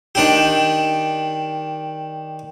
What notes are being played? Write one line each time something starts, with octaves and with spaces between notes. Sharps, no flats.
D#3 D4 G4